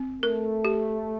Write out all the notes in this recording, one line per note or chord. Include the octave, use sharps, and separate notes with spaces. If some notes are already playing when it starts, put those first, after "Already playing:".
Already playing: C4
A3 A#4
G4